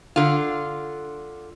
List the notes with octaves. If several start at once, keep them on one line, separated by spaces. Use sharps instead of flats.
D3 F4